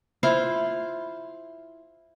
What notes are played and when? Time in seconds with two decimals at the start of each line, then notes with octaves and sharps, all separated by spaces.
0.23 E4 F4 C5